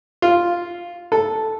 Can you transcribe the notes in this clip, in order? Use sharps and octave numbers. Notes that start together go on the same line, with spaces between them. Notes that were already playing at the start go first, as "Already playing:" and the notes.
F4
A4